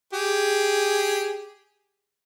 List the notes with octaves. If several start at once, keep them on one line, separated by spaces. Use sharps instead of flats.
G4 G#4